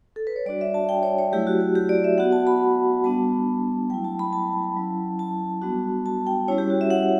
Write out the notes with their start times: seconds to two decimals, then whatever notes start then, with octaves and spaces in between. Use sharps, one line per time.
0.16 A4
0.27 B4
0.36 C#5
0.46 G3 D4 F#4 D5
0.61 E5
0.74 A5
0.89 G5
1.03 C#5
1.19 C#5
1.32 F#3 A3 E4 G4
1.47 F#4
1.61 G4
1.75 G4
1.89 D5
2.04 E5
2.18 B3 F#4 F#5
2.32 A5
2.47 B5
3.04 G3 B3 D4 A5
3.90 F#3 A3 E4 G5
4.04 A5
4.19 B5
4.33 A5
4.77 F#3 C#4 E4
5.19 A5
5.62 G3 B3 D4 F#4
6.06 A5
6.27 G5
6.48 G3 C#4 E4 C#5
6.58 G4
6.70 F#4
6.81 E5
6.90 F#5